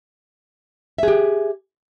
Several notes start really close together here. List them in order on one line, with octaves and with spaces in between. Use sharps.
E5 G#4 G4